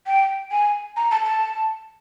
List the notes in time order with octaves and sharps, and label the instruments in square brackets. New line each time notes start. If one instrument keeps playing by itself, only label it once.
[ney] G5
G#5
A#5
A5
A5